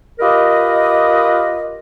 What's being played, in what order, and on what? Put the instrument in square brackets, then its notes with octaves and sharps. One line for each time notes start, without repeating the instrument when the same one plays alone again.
[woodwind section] F4 G4 A#4 B4 D#5